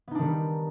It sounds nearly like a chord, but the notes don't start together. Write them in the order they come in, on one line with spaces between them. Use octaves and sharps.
B3 D#4 D4 D#3 G3